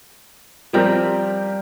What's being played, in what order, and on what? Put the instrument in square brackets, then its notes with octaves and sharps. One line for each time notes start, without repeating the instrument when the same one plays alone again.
[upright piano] F3 C4 G4 A#4 [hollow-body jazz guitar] G3